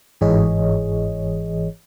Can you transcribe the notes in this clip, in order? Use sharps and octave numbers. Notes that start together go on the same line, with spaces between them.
G1 G#2 E3 G#4 C#5 D#5